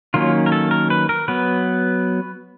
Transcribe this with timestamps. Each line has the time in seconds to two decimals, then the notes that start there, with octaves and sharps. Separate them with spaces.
0.14 D#3 F#3 A#3 C#4 F4
0.46 A#4
0.52 A4
0.71 A#4
0.90 B4
1.09 A#4
1.28 F#3 B3 B4